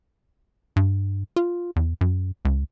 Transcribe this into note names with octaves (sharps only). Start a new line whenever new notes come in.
G2
F4
E2
F#2
C#2